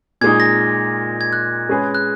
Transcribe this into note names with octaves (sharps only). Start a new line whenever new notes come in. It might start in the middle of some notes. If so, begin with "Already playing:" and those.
A#2 G#3 D#4 G#6
A#6
G#6
F#6
G#3 C#4 G#4 B4
F#6